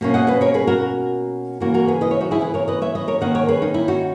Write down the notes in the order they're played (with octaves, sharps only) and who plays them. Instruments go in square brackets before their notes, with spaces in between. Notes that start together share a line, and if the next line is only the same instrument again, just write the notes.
[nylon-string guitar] B2 A#3 C#4
D#5 F#5
B4 D#5
A#4 C#5
G#4 B4
F#4 A#4
C#3 E3 A#3 F#4 A#4
F#4 A#4
G#4 B4
B4 D#5
C#5 E5
D#4 F#4
E4 G#4
G#4 B4
A#4 C#5
B4 D#5
C#5 E5
B4 D#5
A#4 C#5
D#3 A#3 C#4 D#5 F#5
A#4 C#5
G#4 B4
D#4
E4
D#4 F#4